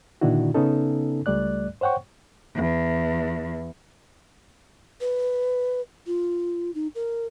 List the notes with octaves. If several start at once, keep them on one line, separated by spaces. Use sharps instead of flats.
A#2 D3 D#3 D4 E4 F#4
C#3 B3 C#4 D#4 A4
C#2 G3 A3 D5 F#6
C5 C#5 F#5 G5 C#6
E2
B4
F4
D#4
A#4